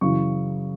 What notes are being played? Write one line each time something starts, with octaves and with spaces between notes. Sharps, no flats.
F#2 C#3 E3 C#6